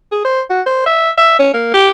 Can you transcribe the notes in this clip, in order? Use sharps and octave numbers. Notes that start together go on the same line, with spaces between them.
G#4
C5
F#4
C5
E5
E5
C#4
A#3
G4